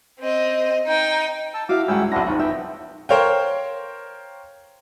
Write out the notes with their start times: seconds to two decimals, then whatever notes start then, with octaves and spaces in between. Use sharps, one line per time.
0.20 C4 D#5
0.87 D#4 G5
1.54 A5 E6
1.69 E4 F#4 E5 F5 D6
1.88 D#1 G3 G#3 C#4 F#5 G5 E6
2.12 B1 C4 D4 E4 F#5 A#6
2.27 F#1 F2 D#4 E4 F#4
2.39 B3 E5 G5
3.09 A#4 C5 C#5 F5 G5